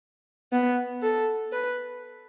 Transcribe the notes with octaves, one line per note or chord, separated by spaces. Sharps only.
B3
A4
B4